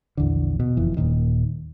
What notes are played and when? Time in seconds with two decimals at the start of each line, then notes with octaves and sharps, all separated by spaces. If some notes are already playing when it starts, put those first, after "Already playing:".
0.17 A#1 E2 D3
0.60 B2
0.77 F#1 F2 E3
0.97 D#1 C2 A#2 D#3